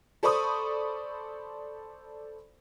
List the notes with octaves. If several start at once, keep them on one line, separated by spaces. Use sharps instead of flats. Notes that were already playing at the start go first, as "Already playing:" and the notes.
A4 C5 D5 B5 C#6 D#6